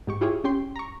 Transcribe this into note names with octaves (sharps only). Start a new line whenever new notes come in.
G#2 G4 C#6
E4 F4 G4 G#4 C#5
C#4 G4 G5 C6
A#5 C#6